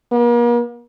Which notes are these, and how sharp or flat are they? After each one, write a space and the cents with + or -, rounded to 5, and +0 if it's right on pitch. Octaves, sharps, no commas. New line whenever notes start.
A#3 +45